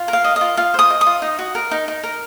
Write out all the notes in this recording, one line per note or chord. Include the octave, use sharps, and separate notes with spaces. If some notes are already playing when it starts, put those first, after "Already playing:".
Already playing: F4
A#4
F5
D#5
D#5
F4
F4 F5
C5 D#6
D#5
D#6
F4
D#4
F#4
A#4
D#4
D#4
A#4